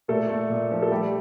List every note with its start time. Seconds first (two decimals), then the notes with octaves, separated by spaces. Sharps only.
0.08 A#2 A3 A4
0.30 A3
0.50 A#2
0.71 F3
0.82 A4
0.91 G3 A3 G4